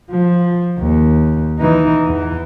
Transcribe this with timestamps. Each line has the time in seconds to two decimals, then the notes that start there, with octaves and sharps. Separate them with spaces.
0.11 F3
0.79 D#2
1.59 E3 D#4
2.07 E2 E3